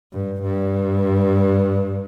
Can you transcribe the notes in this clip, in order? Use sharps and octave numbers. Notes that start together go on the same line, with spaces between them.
G2
G2